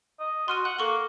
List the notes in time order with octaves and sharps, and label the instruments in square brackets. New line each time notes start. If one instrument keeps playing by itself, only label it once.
[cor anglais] D#5
[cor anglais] F#4 [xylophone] C6 F6 D#7
[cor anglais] F#5 [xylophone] F#6
[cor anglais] A#3 [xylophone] A4 C#6 G7